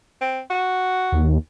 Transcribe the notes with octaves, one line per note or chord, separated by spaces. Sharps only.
C4
F#4
D#2